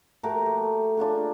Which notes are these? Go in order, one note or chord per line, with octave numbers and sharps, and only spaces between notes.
A3 F#4 G4 A#4
A3
D4 F4 F#4 G#4